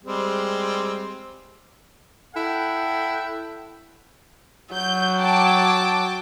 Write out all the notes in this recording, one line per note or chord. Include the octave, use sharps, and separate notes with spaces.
G3 G#3 C4
E4 A4 F#5 G5
F#3 G6
G5 A5 D6